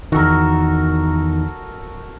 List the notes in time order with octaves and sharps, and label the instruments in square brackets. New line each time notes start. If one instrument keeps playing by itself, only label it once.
[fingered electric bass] E2 D#3 [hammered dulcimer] F#4 A4 A#4